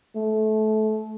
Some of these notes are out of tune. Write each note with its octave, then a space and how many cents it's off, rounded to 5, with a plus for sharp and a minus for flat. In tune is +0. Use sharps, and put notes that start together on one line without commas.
A3 -25